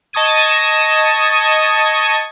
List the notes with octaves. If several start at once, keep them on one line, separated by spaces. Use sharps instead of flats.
D#5 A5 C#6 D#6 G#6 D#7